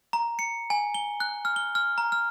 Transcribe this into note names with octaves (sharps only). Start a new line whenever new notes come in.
A#5
C#7
G#5
G7
F#6
F6
G7
F6
A#5
F6